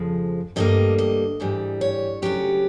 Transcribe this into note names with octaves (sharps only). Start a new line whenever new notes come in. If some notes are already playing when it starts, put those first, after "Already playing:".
Already playing: F2 C#3 F3 G#3
G2 D3 G3 A#3 D#5
D#5
G#2 E3 G3
C#5
D2 C#3 F#3 B3 G4